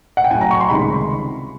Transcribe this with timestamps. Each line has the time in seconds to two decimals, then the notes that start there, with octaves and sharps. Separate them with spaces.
0.17 F#5
0.24 G5
0.31 A2 G#5
0.34 F#3
0.41 A#5
0.51 C#6
0.61 C6
0.70 C#2 C3 D#3 G3 B5